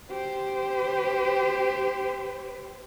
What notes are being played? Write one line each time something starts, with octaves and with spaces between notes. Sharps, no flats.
G4 C5